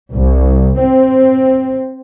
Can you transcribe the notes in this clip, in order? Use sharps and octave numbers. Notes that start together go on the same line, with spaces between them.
C2
C4